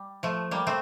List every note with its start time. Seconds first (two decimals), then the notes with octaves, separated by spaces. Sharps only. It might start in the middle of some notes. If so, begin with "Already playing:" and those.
Already playing: G3
0.23 F3 A3
0.51 G3 A#3
0.67 A3 C4